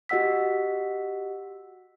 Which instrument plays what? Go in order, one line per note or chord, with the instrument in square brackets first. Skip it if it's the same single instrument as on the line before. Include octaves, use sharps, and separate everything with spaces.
[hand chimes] F#4 G4 D#5 F#5 E6 B6